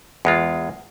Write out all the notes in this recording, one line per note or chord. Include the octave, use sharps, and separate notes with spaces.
E2 G#3 F4